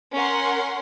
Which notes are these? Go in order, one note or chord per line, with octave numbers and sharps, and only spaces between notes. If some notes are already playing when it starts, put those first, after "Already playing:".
C#4 A#4 F#5 C6